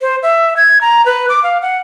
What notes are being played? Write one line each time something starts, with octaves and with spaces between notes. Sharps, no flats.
C5
E5
G#6
A#5
B4
D6
F5
F#5